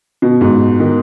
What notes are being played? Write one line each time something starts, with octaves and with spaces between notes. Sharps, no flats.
B2
G#2
D#3